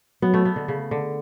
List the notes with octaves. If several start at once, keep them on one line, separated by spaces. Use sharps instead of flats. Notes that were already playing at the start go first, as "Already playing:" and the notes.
F#3 B3
A3
B3
D3
C#3
D3